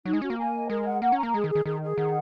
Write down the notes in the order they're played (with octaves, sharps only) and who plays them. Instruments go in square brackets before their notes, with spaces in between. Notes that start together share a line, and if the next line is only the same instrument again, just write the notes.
[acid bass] F#3 [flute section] D#4
[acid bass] G#3
[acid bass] C#4 [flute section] F#4
[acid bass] A#3
[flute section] G#5
D#5
[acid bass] G#3 [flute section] A#4
[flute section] F#5
[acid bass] A#3 [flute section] F#5
[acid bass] C#4 [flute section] A#5
[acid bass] A#3
[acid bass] G#3 [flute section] G#4
[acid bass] D#3
[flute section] G#4
[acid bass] D#3
[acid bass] D#3 [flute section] G#4
[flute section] G#4
[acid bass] D#3 [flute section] F#5